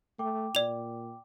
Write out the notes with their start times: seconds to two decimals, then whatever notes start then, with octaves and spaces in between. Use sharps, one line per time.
0.19 A3 G5 D6
0.55 A#2 D5 F7